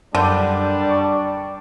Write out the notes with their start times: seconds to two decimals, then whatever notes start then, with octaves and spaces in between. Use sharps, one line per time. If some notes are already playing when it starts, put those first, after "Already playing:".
0.15 F#2 D3 G3 D4 A#4 G6
0.89 A5 C#6 D6